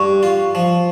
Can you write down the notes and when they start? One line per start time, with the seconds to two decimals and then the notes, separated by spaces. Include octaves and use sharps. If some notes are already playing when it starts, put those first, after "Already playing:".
Already playing: G2 C#6
0.23 F4
0.55 F3